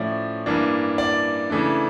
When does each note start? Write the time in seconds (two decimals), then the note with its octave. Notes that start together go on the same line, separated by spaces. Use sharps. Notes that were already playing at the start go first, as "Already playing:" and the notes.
Already playing: A2 F3 C#4 D5 E5
0.46 G2 E3 A#3 D4
0.98 D5
1.50 C#3 E3 A3 D4